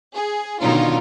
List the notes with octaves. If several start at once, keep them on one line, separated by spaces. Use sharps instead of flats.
G#4
B2 D3 D#3 C#4 D#4 F4